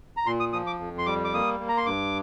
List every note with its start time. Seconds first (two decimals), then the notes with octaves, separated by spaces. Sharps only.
0.17 A#5
0.26 A#2 C6
0.40 D#6
0.53 F3 D#6
0.67 D6
0.79 F2
0.98 C6
1.06 G3 D6
1.24 D6
1.34 A#3 D#6
1.60 A#3
1.69 A#5
1.77 C6
1.86 G2 D6